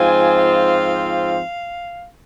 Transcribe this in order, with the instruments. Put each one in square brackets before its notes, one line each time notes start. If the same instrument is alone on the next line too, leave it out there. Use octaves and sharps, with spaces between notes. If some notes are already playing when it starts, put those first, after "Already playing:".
Already playing: [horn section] G#2 F3 C4 F4 G#5
F5